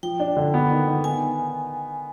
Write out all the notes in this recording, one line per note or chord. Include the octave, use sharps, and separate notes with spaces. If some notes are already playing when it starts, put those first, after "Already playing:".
F3 G5
D4
D3
B3
D#3
D#3
B3 G#5